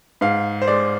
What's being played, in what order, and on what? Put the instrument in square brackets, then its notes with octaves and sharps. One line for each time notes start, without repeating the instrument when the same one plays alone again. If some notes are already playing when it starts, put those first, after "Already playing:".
[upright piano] G#2 F5
C5
G#3 D5